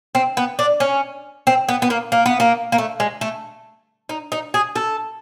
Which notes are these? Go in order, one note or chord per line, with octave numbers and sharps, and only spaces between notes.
C4
B3
D4
C#4
C4
B3
B3
A#3
A#3
B3
A#3
A#3
A3
G#3
A3
D#4
D#4
G#4
A4